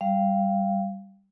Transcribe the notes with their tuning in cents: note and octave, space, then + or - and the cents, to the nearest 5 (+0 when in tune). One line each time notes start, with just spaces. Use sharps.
G3 +0 F5 -10